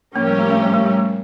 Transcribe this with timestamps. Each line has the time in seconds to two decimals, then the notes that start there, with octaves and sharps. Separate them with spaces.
0.16 A2 F3 A#3 C#4 G4 A#4
0.27 G3
0.39 A3
0.50 A3
0.62 G3
0.74 A3
0.86 G3
0.97 A3